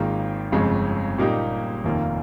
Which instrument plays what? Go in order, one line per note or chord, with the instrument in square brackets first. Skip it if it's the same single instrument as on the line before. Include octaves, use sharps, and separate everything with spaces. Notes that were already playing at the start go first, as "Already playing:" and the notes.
Already playing: [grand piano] G#1 G#2 D#3 A#3 F4
G1 F2 C#3 G#3
A#2 G3 A#3 D#4 G4
F1 D#2 D#3 A#3 F4